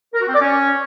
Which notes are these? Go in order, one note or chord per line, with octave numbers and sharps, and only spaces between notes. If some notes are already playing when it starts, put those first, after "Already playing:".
A#4
F#4
C4
D5
C#4